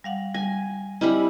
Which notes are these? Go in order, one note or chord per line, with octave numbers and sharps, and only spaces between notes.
G3 F5 F#5
G3 G#5
G3 C4 E4 D#5 G#5 F6